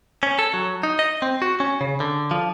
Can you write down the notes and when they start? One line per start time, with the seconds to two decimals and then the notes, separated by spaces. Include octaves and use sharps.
0.23 C#4
0.39 A4
0.54 F#3
0.83 D#4
0.99 D#5
1.22 C4
1.42 F#4
1.60 C#4
1.81 C#3
2.00 D3
2.31 F3